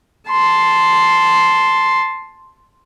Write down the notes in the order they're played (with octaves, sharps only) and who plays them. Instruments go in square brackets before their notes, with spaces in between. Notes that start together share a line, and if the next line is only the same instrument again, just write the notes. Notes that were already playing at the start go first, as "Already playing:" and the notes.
[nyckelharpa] A5 C6